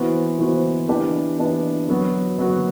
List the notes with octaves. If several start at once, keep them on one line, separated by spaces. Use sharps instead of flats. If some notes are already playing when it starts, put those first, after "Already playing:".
Already playing: E3 B3 F#4 C5
E3 B3 F#4 C5
E3 B3 D4 G4 B4
E3 B3 D4 G4 B4
F#3 B3 F#4
F#3 B3 F#4